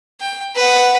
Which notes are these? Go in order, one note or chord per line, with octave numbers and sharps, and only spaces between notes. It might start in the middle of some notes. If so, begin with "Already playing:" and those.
G5
B4 F#5